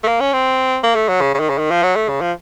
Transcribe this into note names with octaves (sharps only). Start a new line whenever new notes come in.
A3
A#3
C#4
C4
A#3
A3
F#3
C#3
C#3
D#3
C#3
D#3
F3
F#3
A3
C#3
F3